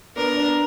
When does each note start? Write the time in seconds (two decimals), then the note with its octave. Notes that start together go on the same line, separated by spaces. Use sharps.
0.16 B3 D4 A#4
0.37 B3 D4